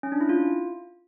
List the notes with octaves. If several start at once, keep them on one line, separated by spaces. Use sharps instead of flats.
C#4
D4
E4
F4